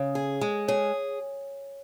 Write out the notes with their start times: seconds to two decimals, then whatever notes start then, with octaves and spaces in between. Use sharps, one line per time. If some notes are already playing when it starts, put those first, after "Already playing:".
Already playing: C#3 C#5
0.15 G#4
0.41 G#3
0.68 G#4 C#5